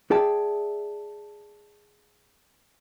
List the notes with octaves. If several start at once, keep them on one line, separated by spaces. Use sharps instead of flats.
G#4 D5 E5 G5 A5